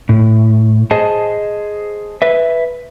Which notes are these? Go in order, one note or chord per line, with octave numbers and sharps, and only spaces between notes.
A2
G#4 C5 D#5 A5
B4 E5